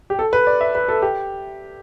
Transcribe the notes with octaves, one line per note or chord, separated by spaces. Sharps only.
G4
A4
B4
D5
E5
B4
A4
G4